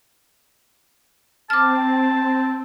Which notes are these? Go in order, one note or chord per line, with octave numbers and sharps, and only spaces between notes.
C4 A5 D6 F6